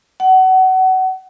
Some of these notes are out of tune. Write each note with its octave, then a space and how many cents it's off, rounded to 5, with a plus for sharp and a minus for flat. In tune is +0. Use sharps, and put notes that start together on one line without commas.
F#5 +25